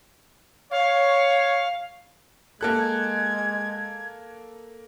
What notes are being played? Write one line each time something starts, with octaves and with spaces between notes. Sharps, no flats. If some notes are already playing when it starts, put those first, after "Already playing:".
C#5 F5
G#3 A#3 A4 F#6 G#6